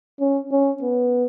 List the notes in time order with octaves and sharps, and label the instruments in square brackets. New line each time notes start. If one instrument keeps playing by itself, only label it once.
[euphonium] C#4
C#4
B3